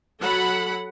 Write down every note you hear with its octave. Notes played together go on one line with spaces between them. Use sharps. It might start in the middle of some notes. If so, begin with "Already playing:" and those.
F#3 A4 F#5 B5